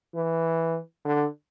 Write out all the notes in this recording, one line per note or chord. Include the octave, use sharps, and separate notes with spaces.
E3
D3